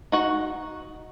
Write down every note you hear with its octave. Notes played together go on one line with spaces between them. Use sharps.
D#4 F#4 F#5